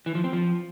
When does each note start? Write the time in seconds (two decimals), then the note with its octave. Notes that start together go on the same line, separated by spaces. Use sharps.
0.06 E3
0.15 F3
0.24 C4
0.33 F3